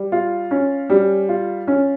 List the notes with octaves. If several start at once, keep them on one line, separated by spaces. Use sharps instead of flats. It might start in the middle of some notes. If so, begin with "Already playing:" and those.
Already playing: G3
F4
C#4
G3
F4
C#4